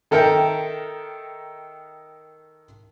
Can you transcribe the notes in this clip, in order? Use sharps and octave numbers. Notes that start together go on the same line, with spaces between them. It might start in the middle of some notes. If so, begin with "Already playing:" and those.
D#3 A4 A#4 E5 G5